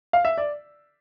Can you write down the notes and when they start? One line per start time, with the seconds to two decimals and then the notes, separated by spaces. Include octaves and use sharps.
0.13 F5
0.25 E5
0.38 D5